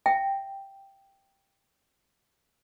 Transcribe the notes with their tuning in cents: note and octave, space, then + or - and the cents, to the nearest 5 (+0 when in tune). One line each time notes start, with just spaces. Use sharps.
E5 +30 G5 +0